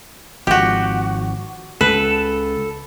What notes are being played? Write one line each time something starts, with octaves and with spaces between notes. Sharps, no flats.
G#1 F3 F#4 G4
C#2 A4 B4